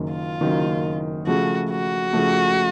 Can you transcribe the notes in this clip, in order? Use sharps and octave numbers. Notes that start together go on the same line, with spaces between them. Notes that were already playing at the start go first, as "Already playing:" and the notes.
Already playing: F#1 F#2 D#3
F4
F#1 F#2 D#3
C#3 F3 A3 F#4
F#4
C#3 F3 A3